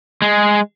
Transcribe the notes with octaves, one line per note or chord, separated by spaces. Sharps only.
G#3